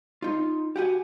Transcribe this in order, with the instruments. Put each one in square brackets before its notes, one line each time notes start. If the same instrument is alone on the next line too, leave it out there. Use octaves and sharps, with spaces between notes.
[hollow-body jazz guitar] D#4 F4
[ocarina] F#4 [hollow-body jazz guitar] G4 F#5 G#5